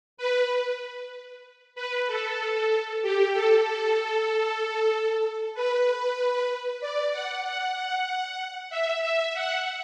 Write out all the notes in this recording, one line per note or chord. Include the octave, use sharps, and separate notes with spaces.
B4
B4
A4
G4
A4
A4
B4
D5
F#5
F#5
E5
E5
F#5